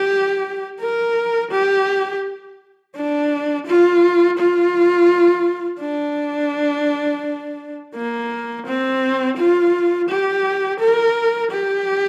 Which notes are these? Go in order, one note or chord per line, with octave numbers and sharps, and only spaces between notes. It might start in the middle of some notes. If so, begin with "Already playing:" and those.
Already playing: G4
A#4
G4
D4
F4
F4
D4
A#3
C4
F4
G4
A#4
G4